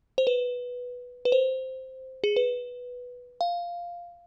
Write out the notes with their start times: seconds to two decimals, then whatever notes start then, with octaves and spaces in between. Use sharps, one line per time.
0.18 C5
0.27 B4
1.25 B4
1.32 C5
2.24 G#4
2.36 B4
3.41 F5